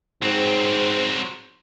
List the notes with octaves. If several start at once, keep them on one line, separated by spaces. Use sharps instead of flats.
G#2 F#3 C4